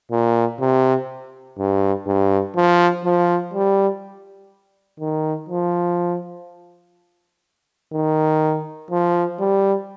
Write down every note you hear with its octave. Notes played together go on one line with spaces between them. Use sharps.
A#2
C3
G2
G2
F3
F3
G3
D#3
F3
D#3
F3
G3